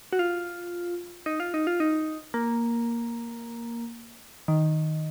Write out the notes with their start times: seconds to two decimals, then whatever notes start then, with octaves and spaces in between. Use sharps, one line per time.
0.13 F#4
0.19 F4
1.26 D#4
1.40 F4
1.54 D#4
1.67 F4
1.80 D#4
2.34 A#3
4.48 D#3